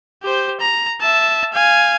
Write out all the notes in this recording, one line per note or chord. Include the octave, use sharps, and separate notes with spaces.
G4 C5
A#5
E5 A5
F5 G#5